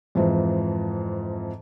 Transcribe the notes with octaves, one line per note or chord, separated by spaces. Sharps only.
F2 G#2 E3 F3